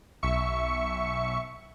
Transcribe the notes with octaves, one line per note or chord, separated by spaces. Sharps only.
B1 E5 C#6 C#7